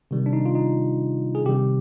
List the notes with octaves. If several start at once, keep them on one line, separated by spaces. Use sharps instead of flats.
C3 D#3 G3
D4
D#4
F4
D#4
G#4
C3 D#3 G3 G4